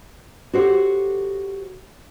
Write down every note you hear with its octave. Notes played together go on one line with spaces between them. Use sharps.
F#4 G4 A4 C5 C#5 F#5